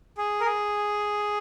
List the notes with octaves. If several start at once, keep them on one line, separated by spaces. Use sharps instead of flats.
G#4
A#4
G#4